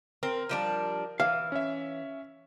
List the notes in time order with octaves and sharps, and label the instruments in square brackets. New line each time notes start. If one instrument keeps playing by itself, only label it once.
[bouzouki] C4 [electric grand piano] A#4
[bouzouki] F3 G3 D4
[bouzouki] E3 [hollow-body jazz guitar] F5
[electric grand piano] C#4 E5